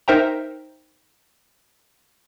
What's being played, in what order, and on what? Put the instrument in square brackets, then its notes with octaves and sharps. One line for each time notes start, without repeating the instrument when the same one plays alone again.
[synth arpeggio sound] D#4 A#4 C5 E5 G5 A#5